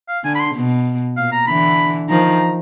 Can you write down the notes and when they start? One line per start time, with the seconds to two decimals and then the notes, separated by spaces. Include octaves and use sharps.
0.09 F5
0.25 D3 G#5
0.35 B5
0.40 C6
0.55 B2
1.17 A#2 F5
1.32 A#5
1.47 D3 E3 B5
2.09 D#3 F3 A#5